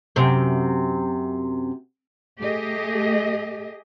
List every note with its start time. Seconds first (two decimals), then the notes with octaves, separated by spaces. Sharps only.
0.16 F#2 C3
2.39 A3 G4 G#4 D#5